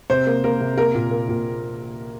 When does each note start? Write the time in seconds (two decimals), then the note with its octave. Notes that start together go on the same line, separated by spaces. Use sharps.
0.10 C3 C5
0.27 A#3
0.44 A#3 A#4
0.60 C3
0.77 A#3 A#4
0.95 A#2
1.11 A#3
1.28 A#2